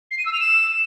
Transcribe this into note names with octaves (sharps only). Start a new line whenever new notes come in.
C7
D#7
E6
F7
E7